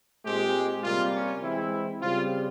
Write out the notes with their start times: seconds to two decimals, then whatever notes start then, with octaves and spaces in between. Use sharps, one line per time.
0.25 A#2 G#3 C4 G4
0.83 C3 G3 A#3 F4
1.13 C#4
1.41 E3 G#3 C4 E4
2.01 C#3 G3 C4 F4